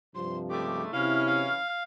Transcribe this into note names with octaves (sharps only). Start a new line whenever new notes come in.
G2 C3 F3 C6
C#3 G#3 A3 G4 D6
C3 E3 F#3 C#4 E4 F5 F6
F5